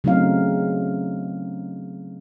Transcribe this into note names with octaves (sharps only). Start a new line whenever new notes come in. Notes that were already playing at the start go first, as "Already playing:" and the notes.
C#3 F#3 A3 C4 D#4 F5